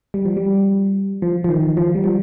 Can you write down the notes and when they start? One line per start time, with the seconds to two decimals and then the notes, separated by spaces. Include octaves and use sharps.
0.14 G3
0.25 F3
0.37 G3
1.22 F3
1.44 F3
1.49 D#3
1.77 F3
1.95 G3
2.04 F3